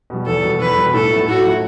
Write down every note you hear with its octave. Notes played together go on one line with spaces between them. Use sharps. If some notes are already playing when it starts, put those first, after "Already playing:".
B2 G3
E2 A4
B2 G3
E2 B4
B2 G3
A2 A4
F#3 A3 E4
A2 F#4
F#3 A3 E4